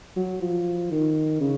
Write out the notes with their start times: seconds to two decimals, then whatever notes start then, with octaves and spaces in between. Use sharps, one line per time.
0.16 F#3
0.41 F3
0.91 D#3
1.41 C#3